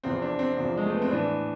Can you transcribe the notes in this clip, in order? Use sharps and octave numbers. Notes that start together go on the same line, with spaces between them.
E2 C3 F3 C4
D4
C4
E2 C3 F3
G#3
A3
B3
C4
A2 E3 D4